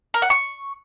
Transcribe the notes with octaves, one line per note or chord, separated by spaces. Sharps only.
A#4
F#5
C#6